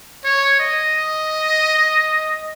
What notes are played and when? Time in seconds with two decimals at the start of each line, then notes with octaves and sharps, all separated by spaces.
0.25 C#5
0.60 D#5